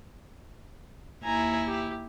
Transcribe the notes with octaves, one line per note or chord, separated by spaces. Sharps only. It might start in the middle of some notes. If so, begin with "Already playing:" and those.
D#2 E4 G#5 A#5
G4